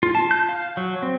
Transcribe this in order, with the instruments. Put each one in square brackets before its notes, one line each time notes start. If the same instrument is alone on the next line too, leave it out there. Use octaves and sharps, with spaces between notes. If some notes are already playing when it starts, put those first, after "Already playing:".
[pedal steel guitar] F4
A5
G6
F5
F#3
C4